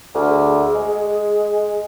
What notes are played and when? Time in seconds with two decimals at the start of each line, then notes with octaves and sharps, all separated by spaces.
0.15 D2 G#4
0.75 G#3